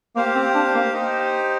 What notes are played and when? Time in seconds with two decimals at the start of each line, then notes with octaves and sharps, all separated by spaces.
0.16 A#3 G4 C5 F5
0.35 C4
0.54 D4
0.74 A#3
0.93 D#4 G4 C5